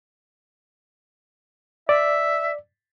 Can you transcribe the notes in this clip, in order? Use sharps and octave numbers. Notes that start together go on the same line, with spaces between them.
D5 E5